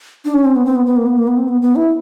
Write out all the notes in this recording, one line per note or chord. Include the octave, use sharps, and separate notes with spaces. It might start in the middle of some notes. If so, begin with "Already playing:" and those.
D4
C#4
C4
B3
C4
B3
B3
A#3
B3
A#3
B3
C4
B3
B3
E4